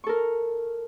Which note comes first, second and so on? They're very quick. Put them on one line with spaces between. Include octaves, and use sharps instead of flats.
C#6 A4 A#4